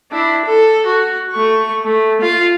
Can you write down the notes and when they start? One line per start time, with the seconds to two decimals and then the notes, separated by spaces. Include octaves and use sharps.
0.12 D4 E4
0.45 A4
0.86 F#4
1.32 A3 C#6
1.84 A3
2.21 F4